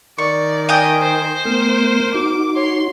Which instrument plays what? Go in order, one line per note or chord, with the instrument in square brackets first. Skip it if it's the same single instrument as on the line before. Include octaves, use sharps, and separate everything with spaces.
[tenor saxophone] D#3 [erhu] D5 [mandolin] C#6
[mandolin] D#5 G5 G#5
[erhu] C5
[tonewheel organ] A3 B3 [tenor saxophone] A#4
[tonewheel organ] D#4 F#4 [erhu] D6
[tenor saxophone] C#5 [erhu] C6